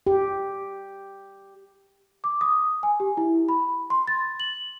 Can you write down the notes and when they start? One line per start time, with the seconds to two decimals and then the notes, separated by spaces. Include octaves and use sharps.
0.07 G4
2.24 D6
2.41 D#6
2.83 G#5
3.00 G4
3.17 E4
3.49 B5
3.90 C6
4.07 A6
4.40 F#7